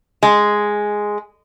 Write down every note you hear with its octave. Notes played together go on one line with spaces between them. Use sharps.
G#3